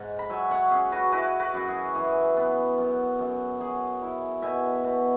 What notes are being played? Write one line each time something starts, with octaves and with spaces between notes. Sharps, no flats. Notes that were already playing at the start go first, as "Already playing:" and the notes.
Already playing: G#2 F#5
B5
F#3 E5 G#5
C#5 F#5
C#4 G#4
F#4 B4
E4 F#4 B4
F#4 B4
F#2
G#4
E3 G#4
B3
F#2
F#2
F#3 G#4
E4
B2 E5 G#5
B2